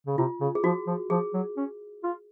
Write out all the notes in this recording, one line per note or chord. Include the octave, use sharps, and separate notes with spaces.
C#3
C3 F4
C#3
G#4
F3 F#4
F3
F3 G#4
F#3
C#4
F4